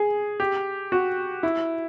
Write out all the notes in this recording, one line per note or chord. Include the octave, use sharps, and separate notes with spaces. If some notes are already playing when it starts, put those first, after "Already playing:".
Already playing: G#4
G4
F#4
E4